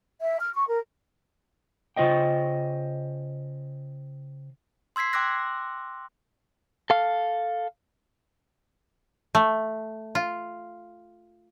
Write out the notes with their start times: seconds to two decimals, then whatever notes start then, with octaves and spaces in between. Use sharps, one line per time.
0.20 E5
0.41 F6
0.55 C#6
0.69 A#4
1.96 C#3 F4 C5 D#5 G5
4.96 C6 E6 G#6 B6 C7
5.13 G5 C6 D6 E6 F#6 A#6
6.90 A4 F5
9.35 A3
10.15 F4